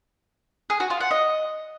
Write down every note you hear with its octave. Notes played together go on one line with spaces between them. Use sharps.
G#4
F#4
F4
F#5
D#5